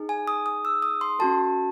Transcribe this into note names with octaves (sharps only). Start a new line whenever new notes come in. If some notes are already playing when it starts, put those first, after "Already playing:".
Already playing: D#4 G#4
G#5
D#6
D#6
E6
D#6
C6
C#4 F#4 A4 A5